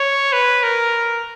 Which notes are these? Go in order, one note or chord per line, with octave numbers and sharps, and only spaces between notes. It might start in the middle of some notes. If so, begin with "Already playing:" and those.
Already playing: C#5
B4
A#4